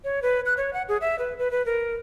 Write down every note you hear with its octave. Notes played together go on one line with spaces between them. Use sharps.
C#5
B4
F#6
C#5
F#5
G#4
E5
B4
B4
B4
A#4